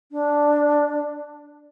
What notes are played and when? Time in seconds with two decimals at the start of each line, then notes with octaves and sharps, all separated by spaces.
0.12 D4